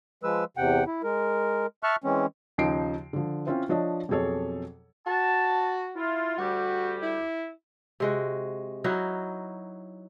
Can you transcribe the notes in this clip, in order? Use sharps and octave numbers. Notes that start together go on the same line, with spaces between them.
F3 G#3 B4 E6
E2 C3 F#5 G5
E4
G#3 A#4
E5 A5 C#6 F6 F#6
E3 G#3 C4 C#4
D#2 C#3 F3 D#4 C7 D7
D3 F3
C4 C#4 E4 F4 C5
F3 D4 C#5 D#5
F2 B2 F#3 G#4 A4 C#5
F#4 A5
E4 F4
D2 G3 F#4 G4
E4
C3 G#3 F#4
F#3 D#4 E4 F#4